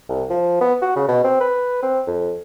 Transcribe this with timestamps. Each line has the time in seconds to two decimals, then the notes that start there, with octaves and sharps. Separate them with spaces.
0.09 C2
0.30 F3
0.60 B3
0.82 F#4
0.96 C#3
1.08 B2
1.24 C4
1.40 B4
1.83 C4
2.07 F2